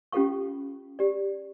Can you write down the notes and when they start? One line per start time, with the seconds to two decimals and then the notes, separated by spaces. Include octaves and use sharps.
0.12 C#4 F4 G4 A4 F5 C#6
0.99 G4 D5